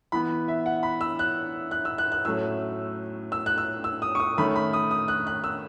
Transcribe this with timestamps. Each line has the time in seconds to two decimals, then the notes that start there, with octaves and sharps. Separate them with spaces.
0.12 E3 B3 B5
0.48 E5
0.66 F#5
0.83 B5
1.01 E6
1.19 F#6
1.71 F#6
1.85 E6
1.98 F#6
2.12 F#6
2.25 A2 F#3 A3 C#4 E6
3.32 E6
3.46 F#6
3.58 E6
3.84 E6
4.02 D#6
4.15 C#6
4.20 D#6
4.38 D#3 A3 C#4 B5
4.56 B5
4.73 D#6
4.91 D#6
5.08 F#6
5.27 F#6
5.44 E6